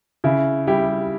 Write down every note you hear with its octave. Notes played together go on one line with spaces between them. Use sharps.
C#3 E4
G3 E4 G4